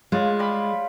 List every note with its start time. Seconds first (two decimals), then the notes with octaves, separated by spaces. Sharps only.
0.12 G#3 F4 B4 C#5
0.39 G3 B5